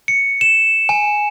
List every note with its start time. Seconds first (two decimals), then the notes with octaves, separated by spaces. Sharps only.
0.08 C#7
0.41 E7
0.89 G#5